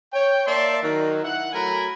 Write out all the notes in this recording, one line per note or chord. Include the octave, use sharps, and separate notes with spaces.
C#5 G5
A#3 D5 E5 A5 C6
D#3 F#3
E4 F#5
F#3 A3 A#4 G#5 B5